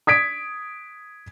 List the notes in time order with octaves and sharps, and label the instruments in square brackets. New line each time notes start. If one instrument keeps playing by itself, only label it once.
[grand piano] D#6 G#6 B6 D7